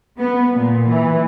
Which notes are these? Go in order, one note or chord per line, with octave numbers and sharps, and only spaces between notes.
B3
A#2
E3